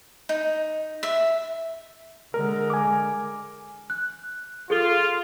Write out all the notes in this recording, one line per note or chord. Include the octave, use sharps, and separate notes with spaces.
D#4
E5
D3 G#3 A#4
G#5 D6
F#6
F4 G#4 A4 G7